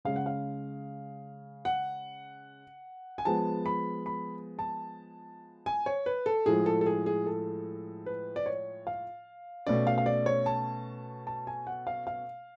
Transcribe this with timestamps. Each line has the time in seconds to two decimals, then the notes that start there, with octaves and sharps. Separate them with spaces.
0.05 C#3 G#3 C#4 F5
0.16 F#5
0.26 F5
1.65 F#5
3.18 G#5
3.25 F3 G#3 B3 A5
3.66 B5
4.06 B5
4.59 A5
5.66 G#5
5.86 C#5
6.06 B4
6.26 A4
6.46 A2 F3 G#3 G#4
6.66 A4
6.81 A4
6.86 G#4
7.06 G#4
7.26 A4
8.06 B4
8.36 D5
8.46 C#5
8.87 F5
9.67 B2 A3 C#4 D5
9.87 F5
9.98 F5
10.06 D5
10.26 C#5
10.46 A5
11.27 A5
11.47 G#5
11.67 F#5
11.87 F5
12.07 F5